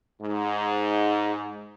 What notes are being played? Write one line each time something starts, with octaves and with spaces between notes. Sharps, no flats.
G#2